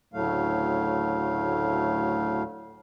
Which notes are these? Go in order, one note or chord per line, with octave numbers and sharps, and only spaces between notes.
D2 A2 C#3 F#3 A3 F5